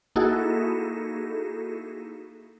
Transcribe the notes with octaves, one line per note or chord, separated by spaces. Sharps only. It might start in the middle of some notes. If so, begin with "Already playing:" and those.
A#3 D#4 E4 F#4 G#4 A4